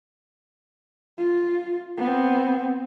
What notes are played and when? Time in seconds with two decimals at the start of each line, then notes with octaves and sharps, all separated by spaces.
1.18 F4
1.98 B3 C4